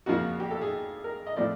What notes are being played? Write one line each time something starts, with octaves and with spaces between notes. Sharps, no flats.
F2 C#3 F3 A#3 F#4
G4
A4
G#4
A#4
D#5
A2 F3 A3 C4 D5